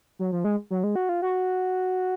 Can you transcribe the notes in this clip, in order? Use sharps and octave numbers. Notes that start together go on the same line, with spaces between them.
F#3
F3
G#3
F#3
G#3
F#4
F4
F#4